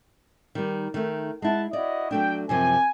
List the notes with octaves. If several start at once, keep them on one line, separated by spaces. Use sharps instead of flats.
D#3 G3
D#3 A3
G#3 E4 F#5 A5
E4 F#4 D5 D#5
F#3 A3 D4 G5
F#2 C3 F3 G#5